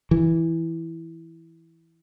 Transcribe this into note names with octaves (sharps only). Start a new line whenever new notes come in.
E3